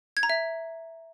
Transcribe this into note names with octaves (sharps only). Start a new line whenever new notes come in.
G#6
A#5
E5